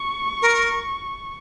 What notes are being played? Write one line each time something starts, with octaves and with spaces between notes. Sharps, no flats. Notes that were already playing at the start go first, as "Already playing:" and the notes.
Already playing: C#6
A#4